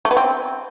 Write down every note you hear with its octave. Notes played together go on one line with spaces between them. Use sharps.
A3
B3
C4